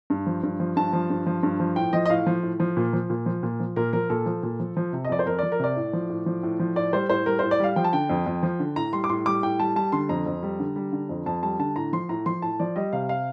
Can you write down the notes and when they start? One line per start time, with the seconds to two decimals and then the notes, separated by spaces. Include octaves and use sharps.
0.10 G2
0.26 F3
0.43 G2
0.60 F3
0.76 G2 A5
0.93 F3
1.10 G2
1.26 F3
1.43 G2
1.60 F3
1.76 A2 G5
1.93 F3 D#5
2.06 D#5
2.10 A2 F5
2.26 F3
2.43 A2
2.60 F3
2.77 A#2
2.93 F3
3.10 A#2
3.26 F3
3.43 A#2
3.60 F3
3.76 A#2 A#4
3.93 F3 A#4
4.10 A#2 A4
4.26 F3
4.43 A#2
4.60 F3
4.77 F3
4.93 C3
5.05 D#5
5.10 F2 D5
5.19 C5
5.26 F2 A#4
5.39 F3 D5
5.52 A#4
5.60 C3 D5
5.76 A2
5.93 F3
6.10 A2
6.26 F3
6.43 A2
6.59 F3
6.76 A2 D5
6.93 G3 C5
7.09 A2 C5
7.26 G3 A#4
7.39 A2 C5
7.51 D5
7.60 G3 F5
7.76 F3 G5
7.84 A5
7.93 D3 G5
8.10 F2
8.26 F2
8.43 F3
8.59 D3
8.76 A2 A#5
8.93 G3 C6
9.04 D6
9.09 A2 C6
9.26 G3 D6
9.43 A2 G5
9.59 G3 A5
9.76 G3 A5
9.92 D3 C6
10.09 F2 A#5
10.26 F2
10.43 G3
10.59 D3
10.76 G3
10.93 D3
11.09 F2
11.26 F2 A5
11.43 G3 A5
11.59 D3 A5
11.76 A2 A#5
11.93 F3 C6
12.09 A2 A#5
12.26 F3 C6
12.42 A2 A5
12.60 F3 D5
12.76 G3 D#5
12.93 C3 F5
13.09 F5